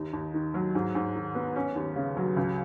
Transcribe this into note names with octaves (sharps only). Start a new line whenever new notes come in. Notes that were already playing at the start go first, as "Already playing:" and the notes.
Already playing: D#2 D#4
D#2
D#3
F#3
G#2
G#2
D#3
B3
C#4
D#2
C#3
F#3
C#2